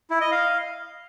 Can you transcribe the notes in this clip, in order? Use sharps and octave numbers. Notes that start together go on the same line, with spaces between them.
E4
D#5
F5